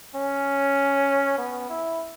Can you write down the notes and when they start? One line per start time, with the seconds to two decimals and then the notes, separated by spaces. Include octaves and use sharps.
0.16 C#4
1.38 B3
1.69 E4